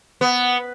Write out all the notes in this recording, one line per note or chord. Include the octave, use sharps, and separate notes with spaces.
B3